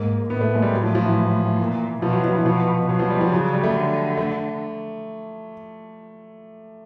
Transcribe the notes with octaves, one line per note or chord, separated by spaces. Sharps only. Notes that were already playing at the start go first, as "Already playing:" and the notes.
Already playing: G#2 A#3
A2 B3
A3
G#3
G3
A2 F#3
F3
F3
E3
A#2
B2 F3
F#3
F3
E3
B2 F3
B2 F#3
F3
G3
F3
C#3 F#3
G3
A3
D3
A3